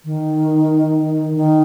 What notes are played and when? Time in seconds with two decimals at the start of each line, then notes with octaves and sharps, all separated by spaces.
0.05 D#3
1.34 D#3